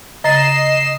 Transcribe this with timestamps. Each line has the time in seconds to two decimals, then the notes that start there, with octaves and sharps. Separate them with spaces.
0.24 C#3 D#5 A#5 A6 C7 E7